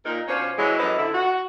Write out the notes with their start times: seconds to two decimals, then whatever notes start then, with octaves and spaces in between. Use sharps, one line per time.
0.05 A#2 D#4 A#4
0.28 B2 C#4 D4 F4 C5 C#5
0.58 E3 F#3 G#3
0.79 F#2 E3 B3 A4 C5 D#5
0.98 D3 E4
1.14 F#4